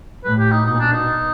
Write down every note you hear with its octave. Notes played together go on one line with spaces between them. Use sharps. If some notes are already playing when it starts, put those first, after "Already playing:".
A2 B4
G4
D#4
B2 D#4
D4
D#4